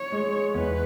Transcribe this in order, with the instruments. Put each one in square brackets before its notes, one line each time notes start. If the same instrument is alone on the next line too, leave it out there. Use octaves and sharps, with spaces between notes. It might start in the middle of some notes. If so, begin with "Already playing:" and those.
Already playing: [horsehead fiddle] C#5
[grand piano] G#3
[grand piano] E2 [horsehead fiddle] B4